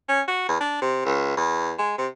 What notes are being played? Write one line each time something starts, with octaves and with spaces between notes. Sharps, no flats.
C#4
F#4
E2
D4
C3
C#2
E2
G#3
C3